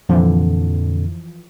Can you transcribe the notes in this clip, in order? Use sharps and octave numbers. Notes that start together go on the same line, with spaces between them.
F2 A#2 D3 E3 F3